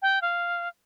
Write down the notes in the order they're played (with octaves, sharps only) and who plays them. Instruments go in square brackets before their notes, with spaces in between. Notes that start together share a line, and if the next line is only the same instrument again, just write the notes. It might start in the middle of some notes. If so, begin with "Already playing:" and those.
[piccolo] G5
F5